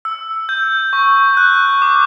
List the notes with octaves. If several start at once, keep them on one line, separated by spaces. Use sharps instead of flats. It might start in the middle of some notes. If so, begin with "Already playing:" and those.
E6
G6
C#6
F#6
D6